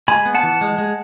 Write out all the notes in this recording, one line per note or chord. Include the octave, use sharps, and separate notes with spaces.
G#3 G#5 B5
B3
F#5 A5
E3
G#3
G#3